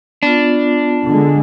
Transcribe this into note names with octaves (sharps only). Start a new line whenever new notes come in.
B3 D4 F4
D3 G#3